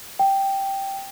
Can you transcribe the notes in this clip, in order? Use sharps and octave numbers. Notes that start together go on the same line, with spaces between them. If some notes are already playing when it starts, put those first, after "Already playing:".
G5